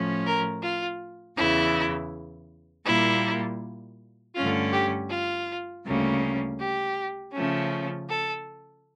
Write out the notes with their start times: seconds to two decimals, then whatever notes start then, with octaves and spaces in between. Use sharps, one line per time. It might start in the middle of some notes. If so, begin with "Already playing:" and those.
Already playing: A2 F3 C#4
0.26 A#4
0.63 F4
1.37 E2 C#3 E3 E4
2.86 A#2 G3 A#3 E4
4.35 G2 D3 A3 C#4 F4
4.73 G4
5.10 F4
5.85 D2 C#3 G3 A#3 C#4
6.60 G4
7.33 C#3 F3 A3 C#4
8.09 A4